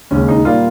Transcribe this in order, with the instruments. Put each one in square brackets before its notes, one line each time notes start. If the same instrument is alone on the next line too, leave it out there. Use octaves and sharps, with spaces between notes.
[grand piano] D#2 C#3 G#3 C#4
D#4
A#2 G3 A#3 F4